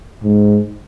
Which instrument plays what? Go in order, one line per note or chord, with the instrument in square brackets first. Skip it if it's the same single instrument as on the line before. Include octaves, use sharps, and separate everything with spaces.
[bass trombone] G#2